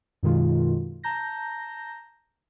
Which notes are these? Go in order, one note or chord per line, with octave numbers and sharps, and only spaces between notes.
F#2 B2 D#3 G#3 F4
A5 A#5 G6 A#6